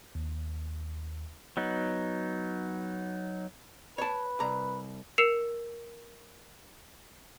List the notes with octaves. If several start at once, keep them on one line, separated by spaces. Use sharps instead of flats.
D#2
F#3 B3 D#4
B4 C#5 A5
C2 A#5
A#4 E6 C7 C#7 E7 F7